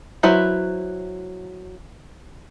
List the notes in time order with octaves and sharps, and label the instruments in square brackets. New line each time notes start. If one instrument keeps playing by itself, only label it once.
[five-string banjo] F#3 E4 B4 C5 E5